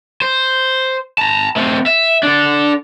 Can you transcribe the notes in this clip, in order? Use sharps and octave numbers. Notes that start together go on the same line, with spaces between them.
C5
A5 A#5
A3 C4
E5
D4 A4